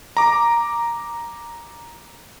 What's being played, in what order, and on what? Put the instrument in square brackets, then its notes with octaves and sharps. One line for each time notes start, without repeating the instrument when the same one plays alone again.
[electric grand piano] A#5 D6